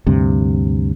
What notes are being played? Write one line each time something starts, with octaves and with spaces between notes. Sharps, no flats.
D2 G2 C3